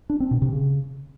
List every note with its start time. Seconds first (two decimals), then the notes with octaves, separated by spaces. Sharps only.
0.10 D4
0.20 C4
0.31 B2
0.42 C3
0.52 C#3